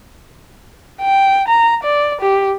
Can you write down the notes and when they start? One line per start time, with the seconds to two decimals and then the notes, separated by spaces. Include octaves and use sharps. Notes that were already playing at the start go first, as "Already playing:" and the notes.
1.01 G5
1.48 A#5
1.83 D5
2.21 G4